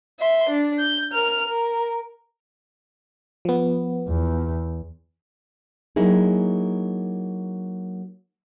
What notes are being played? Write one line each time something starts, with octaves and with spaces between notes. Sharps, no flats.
E5 C6
D4
G6
A#4 F6
A#4
F3 B3
E2
F#3 A#3 D#4 E4 G#4